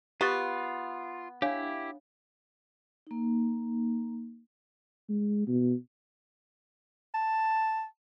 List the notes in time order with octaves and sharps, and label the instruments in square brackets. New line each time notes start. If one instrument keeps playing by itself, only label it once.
[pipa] B3 [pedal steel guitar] F4 [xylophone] G4 C#6 A6
[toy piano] D4 C#5 F5 [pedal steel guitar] E4 G4
[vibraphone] A#3 D#4
[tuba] G#3
B2
[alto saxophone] A5